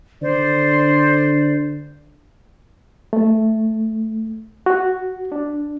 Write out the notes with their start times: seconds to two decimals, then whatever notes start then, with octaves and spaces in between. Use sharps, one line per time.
0.22 D3 C5 D5
3.13 A3
4.66 F#4
5.32 D4